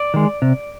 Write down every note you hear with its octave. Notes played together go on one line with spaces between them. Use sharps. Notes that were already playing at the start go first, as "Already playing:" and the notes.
Already playing: D5
D#3 G#3
C3